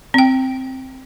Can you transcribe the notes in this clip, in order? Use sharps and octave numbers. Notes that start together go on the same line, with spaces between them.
C4 G5